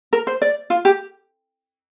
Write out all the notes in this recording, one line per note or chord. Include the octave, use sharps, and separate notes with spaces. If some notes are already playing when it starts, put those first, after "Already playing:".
A#4
C5
D5
F4
G4